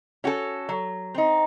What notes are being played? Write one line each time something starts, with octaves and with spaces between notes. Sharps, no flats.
C#4 F#4 A4
F#3
C4 D#4